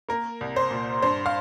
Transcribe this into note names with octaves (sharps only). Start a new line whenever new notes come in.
A#3 A#4
C2
C5
A#2
G2 C5
F5